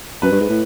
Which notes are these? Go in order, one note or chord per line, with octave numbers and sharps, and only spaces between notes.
F#2 B4
G2
G#2
A2